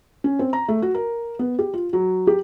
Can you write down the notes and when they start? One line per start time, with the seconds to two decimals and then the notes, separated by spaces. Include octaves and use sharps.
0.24 C#4
0.39 C4
0.53 A#5
0.68 A3
0.82 F#4
0.95 A#4
1.39 B3
1.59 G4
1.74 F4
1.93 F#3
2.27 G4